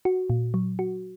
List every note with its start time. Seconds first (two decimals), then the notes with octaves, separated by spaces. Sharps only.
0.05 F#4
0.30 A#2
0.54 F#3
0.79 F#4